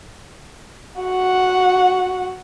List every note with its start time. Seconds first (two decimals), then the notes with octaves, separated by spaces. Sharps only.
1.02 F#4 F#5